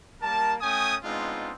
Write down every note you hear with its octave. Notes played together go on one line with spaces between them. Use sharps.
G3 A#3 A#4 A5
A3 C#4 G5 G#5 D#6
G#3 B3 C4 D4 D#4 F4